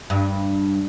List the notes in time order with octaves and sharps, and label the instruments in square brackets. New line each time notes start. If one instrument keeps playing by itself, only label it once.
[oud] G2